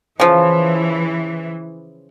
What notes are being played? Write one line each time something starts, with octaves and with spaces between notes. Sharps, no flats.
C#3 E3 F3